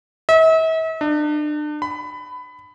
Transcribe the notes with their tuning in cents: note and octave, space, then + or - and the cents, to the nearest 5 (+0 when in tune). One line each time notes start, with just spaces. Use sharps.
E5 -40
D4 +35
B5 +20